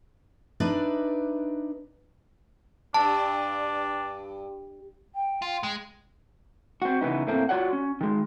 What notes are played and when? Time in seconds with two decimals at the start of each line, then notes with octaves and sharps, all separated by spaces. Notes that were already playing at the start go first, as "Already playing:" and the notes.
0.60 D4 D#4 B4 D5 E5
2.94 G2 D4 A5
5.15 G5
5.42 F4
5.63 G#3
6.82 C4 F#4
7.01 C#3 E3 B3 D#4
7.27 A2 A3 A#3 C4
7.49 F4 F#4 C#5 D5 F#5
7.73 C#4
8.01 D#3 G#3